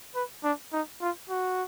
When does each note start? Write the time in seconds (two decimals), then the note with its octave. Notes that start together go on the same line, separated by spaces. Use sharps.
0.15 B4
0.44 D4
0.73 D#4
1.01 F4
1.30 F#4